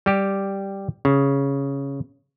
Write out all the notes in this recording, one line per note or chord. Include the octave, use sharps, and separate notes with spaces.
G3 G4
C#3